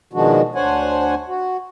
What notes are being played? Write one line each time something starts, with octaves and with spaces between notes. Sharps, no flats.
B2 D#3 F3 G#3 D4 F#4
D2 D4 C5 C#5 F#5 G#5
F#4